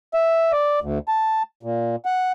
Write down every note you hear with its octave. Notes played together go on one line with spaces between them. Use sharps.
E5
D5
D2
A5
A#2
F#5